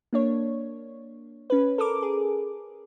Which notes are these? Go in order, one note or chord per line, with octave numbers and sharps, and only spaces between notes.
A#3 D4 C#5
C#4 B4
A4 A#4 D6
G#4